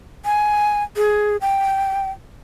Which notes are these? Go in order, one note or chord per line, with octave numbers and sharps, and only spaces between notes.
G#5
G#4
G5